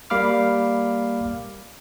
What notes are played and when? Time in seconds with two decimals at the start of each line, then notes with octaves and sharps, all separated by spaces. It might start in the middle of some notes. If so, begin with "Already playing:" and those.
0.10 G3 A#3 F5 B5 D6 F6